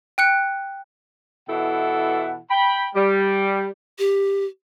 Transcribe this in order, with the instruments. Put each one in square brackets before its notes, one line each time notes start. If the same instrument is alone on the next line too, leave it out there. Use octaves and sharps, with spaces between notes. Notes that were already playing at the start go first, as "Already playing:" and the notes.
[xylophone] G5 F#6 C#7
[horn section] B2 E3 E4 A4 F#5
G5 B5
G3
[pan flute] G4